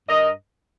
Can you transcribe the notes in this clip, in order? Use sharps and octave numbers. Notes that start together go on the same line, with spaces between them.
G2 A#4 D#5